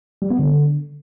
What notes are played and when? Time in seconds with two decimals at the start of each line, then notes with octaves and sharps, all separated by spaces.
0.22 G3
0.31 B3
0.39 D3